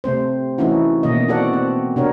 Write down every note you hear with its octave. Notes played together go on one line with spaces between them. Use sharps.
C3 A3 C4 C5
E3 A3 C#4 D#4 E4 F#4
B2 D#3 A#3 D#5
B3 C4 F#4 A4 D5 F#5
C4
C3 D4 F#4 A#4 C#5